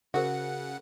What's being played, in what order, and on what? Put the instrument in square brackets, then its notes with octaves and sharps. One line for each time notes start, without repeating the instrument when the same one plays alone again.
[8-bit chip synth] C#3 F#5 [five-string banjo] F#4 [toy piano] G#4 A#4 C5